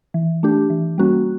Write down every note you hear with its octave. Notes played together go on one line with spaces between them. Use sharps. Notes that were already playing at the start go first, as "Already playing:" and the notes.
E3
A3 D4 G4
E3
G3 A#3 C#4 F#4